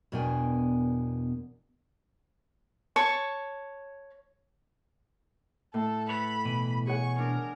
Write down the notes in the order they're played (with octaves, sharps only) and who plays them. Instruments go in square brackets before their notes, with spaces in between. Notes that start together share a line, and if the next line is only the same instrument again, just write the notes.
[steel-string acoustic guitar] E2 B2 D4 A#4 G5 G#5
[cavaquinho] C#5 A5 C#6
[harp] A2 [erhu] A4
[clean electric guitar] A4 B4 C#5 [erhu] B5
[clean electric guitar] B2 E3
[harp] G#4 C#5 F#5 [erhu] C#6
[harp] D4 [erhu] A#4